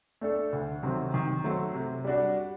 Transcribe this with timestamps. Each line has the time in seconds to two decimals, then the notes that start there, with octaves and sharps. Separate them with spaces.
0.21 A3 D4 A4
0.52 D2
0.83 C3 D#3 F#3 C4
1.14 D#3
1.44 F#3 A3 C4
1.74 C3
2.04 G3 D4 F#4